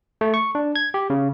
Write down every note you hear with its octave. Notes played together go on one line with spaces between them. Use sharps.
A3
C#6
D4
G#6
G4
C#3